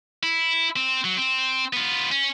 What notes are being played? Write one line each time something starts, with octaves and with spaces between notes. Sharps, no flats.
E4
C4
F#3
C4
B3 F4
C#4